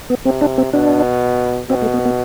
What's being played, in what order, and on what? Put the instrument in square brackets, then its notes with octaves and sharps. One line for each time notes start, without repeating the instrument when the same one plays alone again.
[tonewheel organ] B3
[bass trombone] C3 [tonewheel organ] C4
[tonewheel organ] D4
C4
[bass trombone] B2 [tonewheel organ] D4
[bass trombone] B2 [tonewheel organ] C4
[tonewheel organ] A3
B3
B3